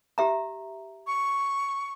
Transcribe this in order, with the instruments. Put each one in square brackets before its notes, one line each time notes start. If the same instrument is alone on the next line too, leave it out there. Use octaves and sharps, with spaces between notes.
[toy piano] G4 E5 A#5
[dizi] C#6